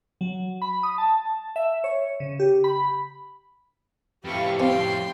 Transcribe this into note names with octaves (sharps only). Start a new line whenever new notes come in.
F#3
B5
D#6
A5
E5
C#5
C#3
G4
B5
F2 A2 G4 B4 F5 C#6
C4 G5 C6